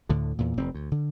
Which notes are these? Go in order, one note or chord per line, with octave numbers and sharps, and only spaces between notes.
D2 A2 D3
E2 A#2
F1 E2 C4
D2
D3